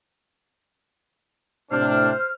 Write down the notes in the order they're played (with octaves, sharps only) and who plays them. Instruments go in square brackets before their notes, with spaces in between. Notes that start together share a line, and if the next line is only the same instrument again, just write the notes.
[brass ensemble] A2 C3 D4 [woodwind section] C5 F6